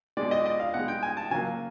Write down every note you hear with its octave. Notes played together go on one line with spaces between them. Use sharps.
B2 G#3 D5
D#5
D5
D#5
F5
B2 G#3 F#5
G5
G#5
A5
C#3 F#3 A#3 G#5